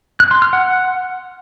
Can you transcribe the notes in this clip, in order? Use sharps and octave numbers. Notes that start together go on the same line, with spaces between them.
F#6
C6
F6
F#5